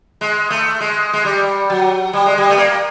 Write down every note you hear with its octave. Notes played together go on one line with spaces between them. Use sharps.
G#3
A3
G#3
G#3
G3
F#3
G3
G#3
G3
A3
A#3